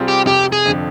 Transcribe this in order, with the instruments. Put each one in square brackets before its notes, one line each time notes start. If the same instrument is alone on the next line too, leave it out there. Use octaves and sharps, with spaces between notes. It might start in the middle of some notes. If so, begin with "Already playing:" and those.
Already playing: [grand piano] C3 G3 C4 F4 G#4
[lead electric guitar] G4
[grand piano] F1 [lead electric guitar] G4
[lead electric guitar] G#4
[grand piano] F2 D3